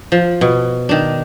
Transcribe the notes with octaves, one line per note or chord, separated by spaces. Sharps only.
F3
B2
D#3 D4